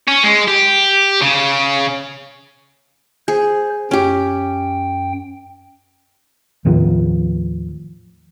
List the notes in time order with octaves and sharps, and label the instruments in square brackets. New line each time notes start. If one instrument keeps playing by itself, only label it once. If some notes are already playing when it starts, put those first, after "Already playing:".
[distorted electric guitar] C#4
G#3
G4
C#3
[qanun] G#4 [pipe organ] C5
[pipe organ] F#2 G5 [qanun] C#4 G4
[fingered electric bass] D#2 A2 D#3 F3